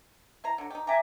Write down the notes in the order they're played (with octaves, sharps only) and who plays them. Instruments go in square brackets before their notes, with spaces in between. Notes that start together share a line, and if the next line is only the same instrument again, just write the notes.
[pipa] E4 C5 A#5
D3 F#3
D#4 G4
[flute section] E5 G#5 D6 [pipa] G5 A#5